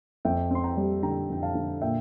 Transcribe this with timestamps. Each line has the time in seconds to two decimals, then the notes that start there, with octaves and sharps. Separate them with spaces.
0.25 F2 E5 G5
0.51 C4 C6
0.64 G5 A#5
0.77 G3
1.03 D3 G5 A#5
1.30 F2 G5
1.43 F5 A5
1.55 D3
1.82 A#2 E5 G5